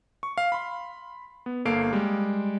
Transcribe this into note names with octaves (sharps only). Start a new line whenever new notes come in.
C#6
F5
B5 C6
B3
G1 A#3 A4 F5 C7 D7
G3 G#3